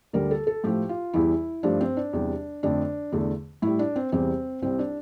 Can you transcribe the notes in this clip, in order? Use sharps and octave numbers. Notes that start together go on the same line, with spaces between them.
D2 D3 G3 A#4
A4
A4
A2 F3 A3 G4
F4
E2 E3 G3 E4
G2 F3 A3 D4
C4
D4
E2 C3 G3
F2 D3 A3 D4
E2 D3 A3
A2 G3 E4
D4
C4
E2 C3 E3 G3 C4
C2 C3 G3 C4
D4